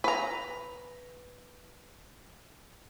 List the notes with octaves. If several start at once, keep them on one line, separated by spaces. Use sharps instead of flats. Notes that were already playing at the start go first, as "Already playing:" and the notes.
B4 A#5